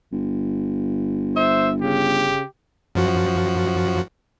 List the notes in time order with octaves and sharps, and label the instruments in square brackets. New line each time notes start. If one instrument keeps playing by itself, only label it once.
[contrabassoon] G1
[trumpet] C5 [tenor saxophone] E5
[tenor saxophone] C#3 [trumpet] G4
[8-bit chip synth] F#2 F3 F#4